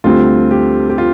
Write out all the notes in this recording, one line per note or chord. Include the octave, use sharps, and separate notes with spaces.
D2 D3 G3 C4 F4
G4
G4
F4